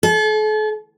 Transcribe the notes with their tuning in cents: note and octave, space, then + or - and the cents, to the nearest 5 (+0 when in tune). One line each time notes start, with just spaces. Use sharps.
A4 -40